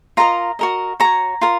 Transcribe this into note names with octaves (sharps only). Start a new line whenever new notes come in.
F4 A#4 D#5 A#5
F#4 A#4 D#5
F#4 C#5 A#5
F4 A#4